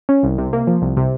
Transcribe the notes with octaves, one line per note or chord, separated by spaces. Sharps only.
C#4
C2
C3
A#3
F3
C2
C3